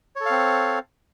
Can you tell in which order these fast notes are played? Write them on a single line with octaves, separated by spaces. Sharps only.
C#5 A4 F5 C4